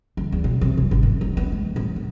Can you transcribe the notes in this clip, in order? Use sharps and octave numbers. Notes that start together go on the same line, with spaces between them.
D2
E2
B2
C3
F#2
G#1
D#3
D#3
B3
G#3
A2
D#3